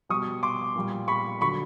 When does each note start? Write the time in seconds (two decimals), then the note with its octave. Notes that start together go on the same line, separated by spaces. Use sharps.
0.09 B2 G3 C#6 D#6
0.43 C6 D6
0.75 A#2 G3
1.08 B5 C#6
1.41 D3 F#3 B5 C#6